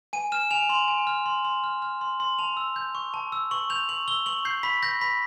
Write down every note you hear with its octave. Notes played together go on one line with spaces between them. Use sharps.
G#5 D#7
F6 E7
G#5 F7
C6 F7
G#5
F6
C6
C6
F6
F6
C6
C6
A5 F7
E6
G6
C#6
A5
E6
C#6 F#7
G6 F7
C#6 F#7
E6 G7
C#6 F#7
G6 C7
B5 B6
G6 A#6
B5 B6